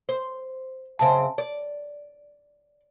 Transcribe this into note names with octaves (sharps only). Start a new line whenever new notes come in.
C5
F#2 C#3 C4 A5
D5